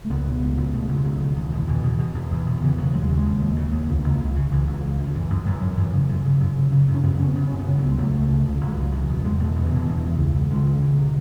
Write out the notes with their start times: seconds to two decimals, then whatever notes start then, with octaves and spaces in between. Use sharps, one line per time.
0.05 A3
0.10 C#2 B3
0.26 B2
0.42 C#2
0.57 C#2
0.73 B2 A3
0.89 C#2
0.97 G#3
1.04 C#2 F#3
1.20 C#2 D#3
1.36 E2
1.52 B2
1.68 B2 E3
1.83 B2
1.99 B2
2.15 E2
2.31 E2
2.46 B2
2.57 D#3
2.62 C#3 E3
2.78 C#3 F#3
2.94 D#2 A3
3.02 G#3
3.09 C#3 F#3
3.17 G#3
3.25 D#2
3.41 D#2
3.56 C#3
3.72 D#2
3.89 C#2
4.04 C#2
4.20 C#2
4.36 C#3
4.51 C#2 E3
4.67 C#2
4.83 C#2
4.99 C#2
5.04 D#3
5.14 F#2 E3
5.30 F#2
5.46 F#2 E3
5.61 F#2
5.77 F#2 E3
5.93 C#3
6.09 F#2
6.25 C#3
6.40 F#2
6.57 C#3
6.72 C#3
6.88 F#2
6.94 C#4
7.03 F#2 B3
7.19 C#3 C#4
7.35 C#3 B3
7.48 F#2 C#4
7.59 B3
7.67 C#3
7.78 C#2 F#3
7.88 G#3
7.98 C#2 A3
8.14 C#2
8.29 C#3
8.45 C#2
8.61 C#2 F#3
8.77 C#2
8.92 E2 F#3
9.09 B2
9.24 E2 G#3
9.39 B2 A3
9.56 B2 B3
9.66 E3
9.71 B2
9.77 E3
9.87 E2 E3
10.03 E2
10.19 C#2
10.35 C#2
10.50 C#2 G#3
10.66 C#2
10.82 C#2 E3
10.97 B2 F#3